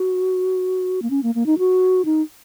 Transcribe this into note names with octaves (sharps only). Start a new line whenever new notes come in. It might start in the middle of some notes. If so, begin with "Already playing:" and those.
Already playing: F#4
A#3
C#4
A#3
A#3
D#4
F#4
D#4